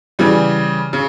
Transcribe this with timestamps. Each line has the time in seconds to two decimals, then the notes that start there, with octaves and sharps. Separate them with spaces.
0.19 C#3 E3 G3
0.93 C#3